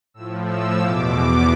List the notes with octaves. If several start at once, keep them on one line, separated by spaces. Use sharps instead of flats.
A2 F3 E6
E6
E2 B2 D6